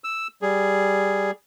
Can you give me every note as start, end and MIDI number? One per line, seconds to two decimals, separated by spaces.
0.04 0.28 88
0.42 1.31 55
0.42 1.31 68